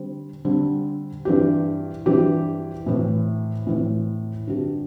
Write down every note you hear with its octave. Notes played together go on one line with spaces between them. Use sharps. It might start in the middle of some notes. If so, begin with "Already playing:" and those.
Already playing: D3 G3 C4
D3 G3 C4
G2 E3 C4 G4
G2 E3 C4 G4
A2 E3 C4
A2 E3 C4
G2 D3 C4 G4